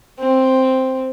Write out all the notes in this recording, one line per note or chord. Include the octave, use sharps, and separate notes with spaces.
C4